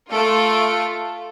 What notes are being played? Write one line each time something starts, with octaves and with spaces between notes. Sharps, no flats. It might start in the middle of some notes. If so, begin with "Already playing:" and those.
A3 F4 A4 D7